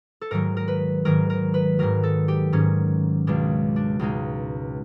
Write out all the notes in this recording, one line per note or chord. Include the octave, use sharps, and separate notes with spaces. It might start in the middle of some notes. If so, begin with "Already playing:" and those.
A4
G#2 D#3 F#3 A#4
A#4
B4
G#2 D#3 F#3 A#4
A#4
B4
G#2 D#3 F#3 A#4
A4
G4
G#2 D#3 F#3 C#4
C#2 B2 G#3 D4
D4
C#2 B2 G#3 D#4